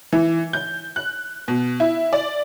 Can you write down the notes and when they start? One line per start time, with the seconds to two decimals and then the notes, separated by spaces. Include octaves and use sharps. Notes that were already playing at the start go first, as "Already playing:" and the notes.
0.13 E3
0.53 G6
0.96 F#6
1.48 B2
1.80 E4
2.13 D5